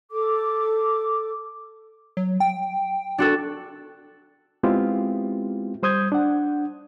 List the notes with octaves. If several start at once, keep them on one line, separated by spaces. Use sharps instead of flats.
A4 D6
F#3
G5
D4 F#4 A4
G#3 B3 C4 E4 F4 G4
G3 C5 D#6 G6 G#6
D4 F#5